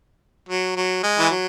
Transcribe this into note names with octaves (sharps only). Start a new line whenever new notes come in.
F#3
F#3
G#3
E3
F#3